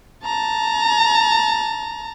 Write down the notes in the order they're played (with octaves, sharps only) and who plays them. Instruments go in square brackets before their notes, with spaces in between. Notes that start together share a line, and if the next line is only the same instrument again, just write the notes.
[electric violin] A5 A#5